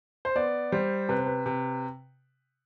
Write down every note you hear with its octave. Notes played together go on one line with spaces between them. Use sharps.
C5
B3 D5
G3 C5
C3 B4
C5
B4
C3